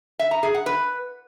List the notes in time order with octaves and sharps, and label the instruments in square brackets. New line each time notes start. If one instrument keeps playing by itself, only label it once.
[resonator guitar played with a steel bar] E5
A#5
G#4
F#5
B4